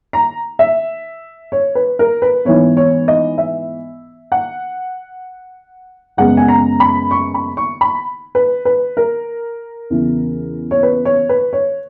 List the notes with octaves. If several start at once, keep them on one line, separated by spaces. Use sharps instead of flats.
A#5
E5
C#5
B4
A#4
B4
G#2 E3 B3 C#5
C#5
D#5
E5
F#5
F#2 C#3 G#3 B3 F#5
G#5
A#5
B5
C#6
B5
C#6
B5
B4
B4
A#4
E2 C#3 E3
C#5
B4
C#5
B4
C#5